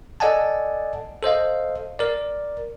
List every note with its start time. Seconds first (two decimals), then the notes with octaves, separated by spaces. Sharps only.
0.20 A4 D5 D#5 F#5 G#5 A5
1.22 A4 C5 D#5 F5
1.99 A#4 D5